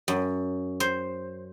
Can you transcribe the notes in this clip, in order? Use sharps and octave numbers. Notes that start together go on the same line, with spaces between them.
F#2
C5